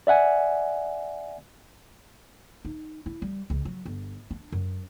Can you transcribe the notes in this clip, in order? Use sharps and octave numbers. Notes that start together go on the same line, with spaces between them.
D5 E5 F#5 G#5
D#4
E4
G3
C#2
F#3
G1
D4
F#2